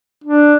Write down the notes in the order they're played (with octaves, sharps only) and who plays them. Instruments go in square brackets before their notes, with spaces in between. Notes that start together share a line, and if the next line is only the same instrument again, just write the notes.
[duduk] D4